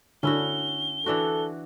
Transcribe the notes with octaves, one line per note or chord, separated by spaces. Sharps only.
D3 C#4 E4 F#4 G7
E3 D4 F#4 A4